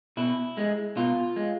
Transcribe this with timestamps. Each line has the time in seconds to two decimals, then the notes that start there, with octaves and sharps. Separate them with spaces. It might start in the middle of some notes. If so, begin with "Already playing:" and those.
0.17 B2 E4
0.58 G#3
0.97 B2 F4
1.36 G#3